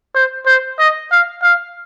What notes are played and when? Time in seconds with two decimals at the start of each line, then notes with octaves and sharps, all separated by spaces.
0.15 C5
0.46 C5
0.79 D#5
1.11 F5
1.43 F5